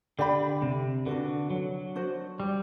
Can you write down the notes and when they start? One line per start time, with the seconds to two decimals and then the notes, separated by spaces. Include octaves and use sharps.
0.18 D3 G4 D5 G5 B5
0.62 C3
1.06 D3 D4 F#4 B4
1.50 F#3
1.95 D4 F#4 C5
2.40 G3